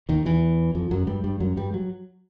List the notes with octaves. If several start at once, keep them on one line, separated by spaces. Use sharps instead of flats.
D#2 D#3
E2 E3
F2 F3
F#2 F#3
G2 G3
G2 G3
F#2 F#3
G2 G3
F#3